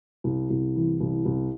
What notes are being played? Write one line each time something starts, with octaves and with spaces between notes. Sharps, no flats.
C2
C2
E3
C2
C2